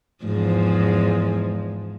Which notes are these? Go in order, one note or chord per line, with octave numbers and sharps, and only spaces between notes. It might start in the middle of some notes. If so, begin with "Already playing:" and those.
E2 G#2 F3